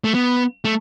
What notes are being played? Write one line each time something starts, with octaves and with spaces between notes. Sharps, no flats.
A3
B3
A3